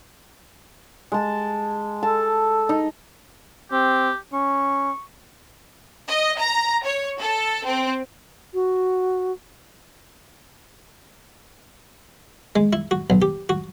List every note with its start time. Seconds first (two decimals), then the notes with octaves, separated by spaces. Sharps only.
1.12 G#3 A5
2.03 A4 A5
2.69 D#4
3.72 C4 G4
4.33 C#4 C#6
6.09 D#5
6.39 A#5
6.85 C#5
7.20 A4
7.67 C4
8.54 F#4
12.56 G#3
12.73 E4
12.91 F#4
13.10 B1
13.22 G4
13.49 F#4